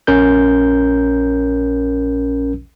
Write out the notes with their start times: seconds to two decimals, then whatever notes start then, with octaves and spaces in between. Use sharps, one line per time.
0.07 A#1 C#4 A#4 G6